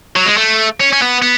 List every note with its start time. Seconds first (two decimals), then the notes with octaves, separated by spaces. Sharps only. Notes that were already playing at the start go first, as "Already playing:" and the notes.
0.16 F#3
0.26 G#3
0.37 A3
0.80 C#4
0.93 C#4
1.02 B3
1.22 B3